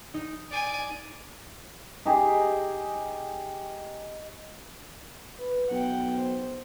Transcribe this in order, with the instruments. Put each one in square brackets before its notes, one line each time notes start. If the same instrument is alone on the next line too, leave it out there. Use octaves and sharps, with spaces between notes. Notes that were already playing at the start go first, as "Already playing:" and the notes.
[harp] D#4
[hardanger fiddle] D5 G#5
[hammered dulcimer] D#4 G4 G#4
[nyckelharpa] B4
[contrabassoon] B1 [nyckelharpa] F#5 G5
[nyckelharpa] C5